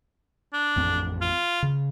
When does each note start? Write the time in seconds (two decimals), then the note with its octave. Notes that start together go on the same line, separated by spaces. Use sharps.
0.53 D4
0.76 A1 F2 C4
1.21 F4
1.63 C#3